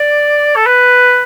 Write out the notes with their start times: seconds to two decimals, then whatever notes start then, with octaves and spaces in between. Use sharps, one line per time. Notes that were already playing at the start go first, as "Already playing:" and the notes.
Already playing: D5
0.56 A4
0.66 B4